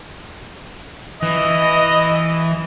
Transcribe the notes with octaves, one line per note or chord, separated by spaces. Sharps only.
E3 D#5